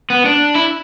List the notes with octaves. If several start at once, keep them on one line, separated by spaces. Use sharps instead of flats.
B3
D4
E4